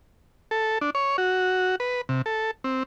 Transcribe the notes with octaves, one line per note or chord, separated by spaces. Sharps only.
A4
D4
C#5
F#4
B4
C3
A4
C4